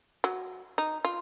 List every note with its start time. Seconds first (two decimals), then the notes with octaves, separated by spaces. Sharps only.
0.24 F#3
0.78 D#4
1.05 F4